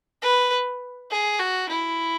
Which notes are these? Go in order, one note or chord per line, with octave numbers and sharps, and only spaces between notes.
B4
G#4
F#4
E4